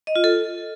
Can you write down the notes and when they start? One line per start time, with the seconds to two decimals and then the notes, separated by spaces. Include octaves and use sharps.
0.07 D#5
0.16 F4
0.24 A4